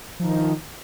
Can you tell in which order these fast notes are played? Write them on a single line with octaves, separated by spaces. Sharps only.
F3 D#4 D#3